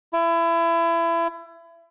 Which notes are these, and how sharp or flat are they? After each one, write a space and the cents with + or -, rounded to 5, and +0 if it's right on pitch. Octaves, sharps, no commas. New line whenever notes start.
E4 +30